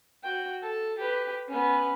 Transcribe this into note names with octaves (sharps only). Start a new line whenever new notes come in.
F#4 G5
A4
G4 B4
B3 C#4